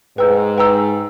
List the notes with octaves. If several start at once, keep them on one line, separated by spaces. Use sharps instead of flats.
G#2 B4 G5 A#5 E6 G6
B4 G5 A#5 E6 G6